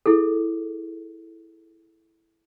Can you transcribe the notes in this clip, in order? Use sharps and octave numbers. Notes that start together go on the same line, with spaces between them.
E4 G#4 A4